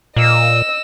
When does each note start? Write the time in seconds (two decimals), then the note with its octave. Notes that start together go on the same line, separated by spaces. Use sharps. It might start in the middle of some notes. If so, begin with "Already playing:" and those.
0.16 A#2 D#5 E6